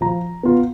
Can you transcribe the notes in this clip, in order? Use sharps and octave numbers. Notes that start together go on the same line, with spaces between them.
F3 A#5
B3 F4